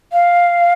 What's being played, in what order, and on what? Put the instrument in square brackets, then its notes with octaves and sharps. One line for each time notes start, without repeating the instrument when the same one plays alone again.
[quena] F5